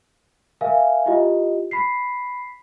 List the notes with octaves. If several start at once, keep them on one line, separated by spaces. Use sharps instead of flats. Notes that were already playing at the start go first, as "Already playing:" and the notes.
A#4 E5 F5 G#5
E4 F4 G4 D#5
B5 B6 C7